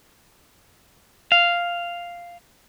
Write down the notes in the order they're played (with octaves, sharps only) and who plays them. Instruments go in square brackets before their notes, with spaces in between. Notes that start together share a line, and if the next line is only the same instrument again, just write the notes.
[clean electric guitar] F5